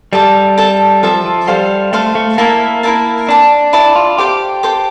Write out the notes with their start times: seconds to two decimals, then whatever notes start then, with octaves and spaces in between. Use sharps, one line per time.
0.13 G3 A4 E5 A5 D6
0.58 A4 E5 A5
1.03 F3 A4 E5 A5
1.25 F3
1.47 G3 A4 C5 F5 C6
1.93 A3 A4 C5 F5 C6
2.15 A3
2.38 A#3 E4 A#4 E5 A5
2.83 E4 A#4 E5 A5
3.28 D4 D5 A5 D6
3.73 E4 D5 A5 D6
3.96 F4
4.18 G4 A4 C5 G5 D6
4.63 A4 C5 G5 D6